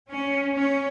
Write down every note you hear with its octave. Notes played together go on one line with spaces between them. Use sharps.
C#4
C#4